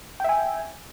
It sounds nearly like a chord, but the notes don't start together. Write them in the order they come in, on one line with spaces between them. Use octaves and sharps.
G5 E5 G#5